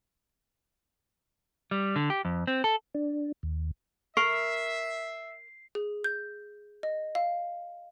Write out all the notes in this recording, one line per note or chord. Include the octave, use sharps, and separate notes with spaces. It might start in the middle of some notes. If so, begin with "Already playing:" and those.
G3
D3
G4
F2
C4
A4
D4
D#2
A#4 E5 C#6 C7
G#4
G6
D#5
F5